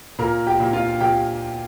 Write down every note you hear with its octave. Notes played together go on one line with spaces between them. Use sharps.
A#2 A#4 A#5
G4 G5
A#2
F4 F5
A#2 G4 G5